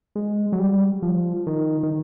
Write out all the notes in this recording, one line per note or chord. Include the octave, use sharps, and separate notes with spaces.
G#3
F#3
G3
F3
D#3
D#3